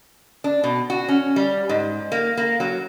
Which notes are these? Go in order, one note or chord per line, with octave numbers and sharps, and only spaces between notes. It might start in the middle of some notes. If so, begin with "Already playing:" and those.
D4
B2
F#4
C#4
G3
G#2
A#3
A#3
F#3